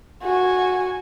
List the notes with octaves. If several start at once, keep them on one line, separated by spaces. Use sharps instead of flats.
F#4 G#5